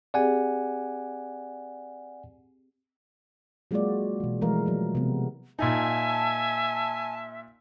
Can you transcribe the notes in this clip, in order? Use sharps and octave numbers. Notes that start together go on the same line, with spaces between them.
C4 G4 G#4 D5 F#5 G#5
F#3 G#3 A#3 F4 F#4 D5
B2 E3
E3 F3 G#3 A3 A#4 F5
F3 F#3
C3 B3
A#2 D#4 E5 G#5 A5